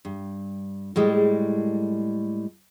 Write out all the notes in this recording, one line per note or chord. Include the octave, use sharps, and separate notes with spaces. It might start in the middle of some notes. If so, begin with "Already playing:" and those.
G2
A2 G3 G#3